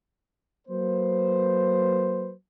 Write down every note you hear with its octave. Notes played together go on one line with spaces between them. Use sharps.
F#3 A#3 B4 C5